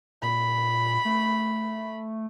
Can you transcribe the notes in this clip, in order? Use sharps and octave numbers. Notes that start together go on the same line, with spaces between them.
A#2 B5
A3